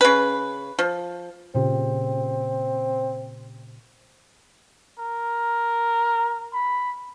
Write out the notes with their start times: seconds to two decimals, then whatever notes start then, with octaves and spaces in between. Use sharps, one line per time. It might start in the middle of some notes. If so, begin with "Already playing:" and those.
0.01 C#3 B4
0.79 F3
1.55 A#2 C#3 C4 G4
4.98 A#4
6.53 B5